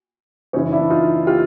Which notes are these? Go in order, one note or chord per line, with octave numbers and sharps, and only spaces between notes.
F#2 C#3 E3 C#4 D#4
D4 E4
D#4 F4
F4 G4